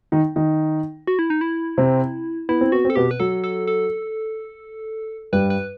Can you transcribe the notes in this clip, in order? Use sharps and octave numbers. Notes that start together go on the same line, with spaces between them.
D#3 D#4
D#3 D#4
F#4
E4
D#4
E4
C3 C4
B3 E4
C4
B3 F#4
C4 A4
B2 B3 G4
B4
F#3 A4
A4
A4
G2 G3 B4
B4